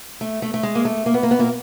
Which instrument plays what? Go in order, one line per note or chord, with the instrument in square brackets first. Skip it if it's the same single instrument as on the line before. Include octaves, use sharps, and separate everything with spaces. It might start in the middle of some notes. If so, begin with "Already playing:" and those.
[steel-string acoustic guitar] A3
A3
A3
G#3
A#3
A3
A#3
B3
A#3
B3
A#2 A#3